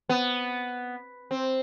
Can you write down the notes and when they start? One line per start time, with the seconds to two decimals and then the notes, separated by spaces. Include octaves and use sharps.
0.09 B3
1.31 C4